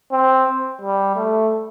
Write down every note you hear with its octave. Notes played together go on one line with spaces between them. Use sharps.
C4
G3
A3